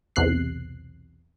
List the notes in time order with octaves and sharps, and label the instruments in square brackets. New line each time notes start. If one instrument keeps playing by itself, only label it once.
[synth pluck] B1 E2 C3 F#6 C7